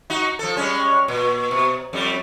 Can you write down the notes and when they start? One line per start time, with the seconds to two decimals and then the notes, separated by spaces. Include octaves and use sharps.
0.10 D#4 F#4
0.39 F3 A4
0.57 G3 G#3 C#4
1.08 A#2
1.51 B2
1.93 F2 G3